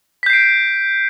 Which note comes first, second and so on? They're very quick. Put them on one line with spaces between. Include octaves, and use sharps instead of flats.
B6 G6 C7 D7